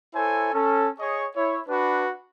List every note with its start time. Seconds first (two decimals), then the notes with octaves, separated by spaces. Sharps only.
0.14 E4 A4 C5 C#5 G#5
0.53 C#4 A4
0.99 G#4 C#5 D#5 C#6
1.35 E4 C#5
1.67 D4 F#4 B4